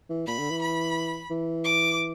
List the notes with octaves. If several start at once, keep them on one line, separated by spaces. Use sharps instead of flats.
E3
A#2 B5
D3
E3
B5
E3
D6